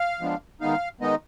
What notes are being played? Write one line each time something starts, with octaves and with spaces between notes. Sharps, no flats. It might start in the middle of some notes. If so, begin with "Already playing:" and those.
Already playing: F5
F3 G#3 B3 D4
D#3 G#3 B3 D#4 F5
D#3 G#3 B3 D#4 D#5